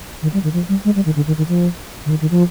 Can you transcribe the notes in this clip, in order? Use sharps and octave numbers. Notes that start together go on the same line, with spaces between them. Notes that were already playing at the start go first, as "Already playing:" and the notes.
D#3
G3
D#3
F3
G3
G#3
G3
D#3
D3
D#3
D#3
F3
D3
D#3
D#3
F3